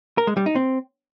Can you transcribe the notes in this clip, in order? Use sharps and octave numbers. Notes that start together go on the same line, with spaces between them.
A#4
G#3
G3
D#4
C4